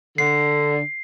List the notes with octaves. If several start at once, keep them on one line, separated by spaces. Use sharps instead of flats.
D3 C7